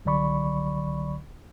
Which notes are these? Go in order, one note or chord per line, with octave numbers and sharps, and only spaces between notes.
C2 D3 F#3 D5 B5 C#6